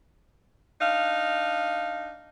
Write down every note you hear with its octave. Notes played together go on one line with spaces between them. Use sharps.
D4 D#4 F5